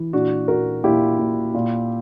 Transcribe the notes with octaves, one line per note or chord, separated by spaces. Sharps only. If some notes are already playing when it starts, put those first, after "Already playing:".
Already playing: E3
A#2 D4 F#4
A#2 F#4 A#4
A#2 E4 G4
A#2
A#2